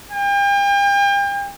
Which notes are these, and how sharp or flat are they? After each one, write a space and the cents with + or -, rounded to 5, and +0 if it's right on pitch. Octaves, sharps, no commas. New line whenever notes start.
G5 +40